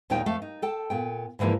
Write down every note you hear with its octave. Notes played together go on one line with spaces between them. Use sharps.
D#2 A#2 G3 D#4 C#5 G5
F2 A3 F5
D#4
A4 G5 A5
A#2 B3 G5
G#2 D3 E3 F3 A#3